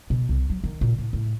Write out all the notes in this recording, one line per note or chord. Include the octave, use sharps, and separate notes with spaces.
B2
C2
F#3
D#3
A#2
A2
A2